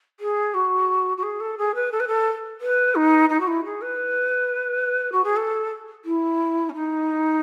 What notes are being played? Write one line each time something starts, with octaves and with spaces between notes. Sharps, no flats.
G#4
F#4
F#4
G#4
A4
G#4
B4
A4
B4
A4
B4
D#4
D#4
F#4
E4
G#4
B4
F#4
G#4
A4
E4
C#4
D#4